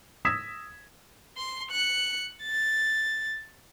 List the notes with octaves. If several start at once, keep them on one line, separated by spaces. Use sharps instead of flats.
D#6 E6 G#6 A#6 B6 E7
C6
F#6 C#7
A6